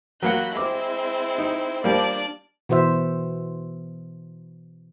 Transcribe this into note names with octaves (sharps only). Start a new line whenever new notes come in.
F#3 A#3 F#4 F#5 B5 G6
G#3 C4 E4 D6
D#4
F3 G3 A#3 D4 D5
B2 E3 F#4 C5 E5